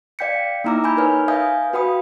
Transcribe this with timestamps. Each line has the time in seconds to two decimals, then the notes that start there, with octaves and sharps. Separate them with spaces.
0.19 D5 F5 G5 G6 B6 C#7
0.64 A#3 D#4 E4 A#5 D6 E6
0.84 G#5 B5 G6
0.96 D#4 A#4 B4 C#5 F6
1.28 B4 E5 F5 G#5 D#6 G6
1.73 F#4 B4 F5 G5 B5 D#6